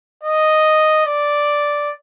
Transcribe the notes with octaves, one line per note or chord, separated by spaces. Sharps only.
D#5
D5